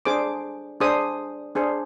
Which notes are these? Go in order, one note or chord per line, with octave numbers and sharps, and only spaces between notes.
D4 G#4 C5 D6
D4 G#4 C5 D#6
D4 G#4 C5